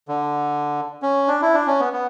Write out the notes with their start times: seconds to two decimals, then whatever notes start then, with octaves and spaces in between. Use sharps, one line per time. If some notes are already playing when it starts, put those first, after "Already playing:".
0.08 D3
1.02 C#4
1.28 D4
1.42 E4
1.54 D4
1.67 C#4
1.80 B3
1.93 B3